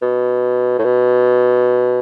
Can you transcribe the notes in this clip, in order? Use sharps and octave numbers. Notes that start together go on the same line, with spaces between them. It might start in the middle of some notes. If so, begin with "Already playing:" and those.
B2
A2
B2